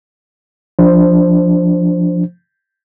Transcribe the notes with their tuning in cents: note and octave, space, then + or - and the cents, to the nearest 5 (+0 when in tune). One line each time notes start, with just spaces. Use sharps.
F3 +0 D4 +0 C5 +0